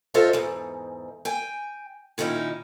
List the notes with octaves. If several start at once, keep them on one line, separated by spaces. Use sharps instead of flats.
F4 A4 C5 C#5 D#5 E5
E2 G#2
G5 G#5
A#2 D#3 C#4 D#4 E4